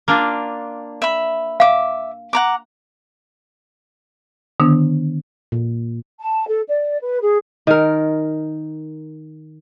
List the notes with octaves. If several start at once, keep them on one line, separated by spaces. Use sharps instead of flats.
A#3 D4 F4
E5 B5
E5 F5 D6
F#5 A#5 D6
D3 D#3 B3 D4
A#2
A5
A4
D5
B4
G#4
D#3 A#4